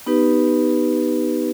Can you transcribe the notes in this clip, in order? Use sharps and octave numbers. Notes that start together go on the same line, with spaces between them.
B3 D#4 G4 B4